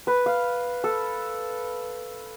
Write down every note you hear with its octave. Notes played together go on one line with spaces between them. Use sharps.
B4
F5
A4